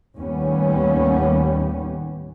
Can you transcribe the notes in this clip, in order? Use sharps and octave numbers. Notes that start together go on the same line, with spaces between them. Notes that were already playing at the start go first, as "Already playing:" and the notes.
D#2 A2 G3 B3 C#4